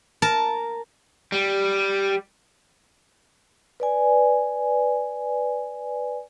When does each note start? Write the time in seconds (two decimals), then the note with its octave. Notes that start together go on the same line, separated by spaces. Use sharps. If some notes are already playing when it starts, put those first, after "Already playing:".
0.22 A#4 A5
1.32 G3
3.80 B4 D5 G#5